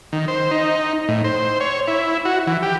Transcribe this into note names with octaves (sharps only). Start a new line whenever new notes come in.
D#3
C5
D#4
A2
C5
C#5
E4
F#4
E3
G4